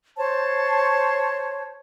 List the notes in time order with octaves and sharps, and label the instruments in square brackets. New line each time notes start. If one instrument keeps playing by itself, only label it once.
[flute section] C5 C#5 A5